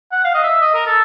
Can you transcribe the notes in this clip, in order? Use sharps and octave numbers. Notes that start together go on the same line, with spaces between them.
F#5
F5
D#5
E5
D#5
A#4
A4